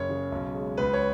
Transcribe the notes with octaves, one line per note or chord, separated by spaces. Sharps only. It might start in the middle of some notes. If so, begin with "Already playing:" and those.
Already playing: F#1 C#5
C#3
B1
G#3
C#2 B4
C#5